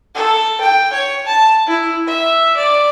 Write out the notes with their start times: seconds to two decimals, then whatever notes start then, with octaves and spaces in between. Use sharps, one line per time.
0.15 A4
0.61 G5
0.93 C#5
1.26 A5
1.67 E4
2.08 E5
2.57 D5